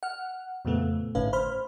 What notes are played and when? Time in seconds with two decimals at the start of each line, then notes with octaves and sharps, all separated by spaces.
0.03 F#5 F6
0.65 F2 A#2 C#3 A3 B3
1.15 G#1 A2 D3 C#4 B4 F5
1.33 C5 B5 F6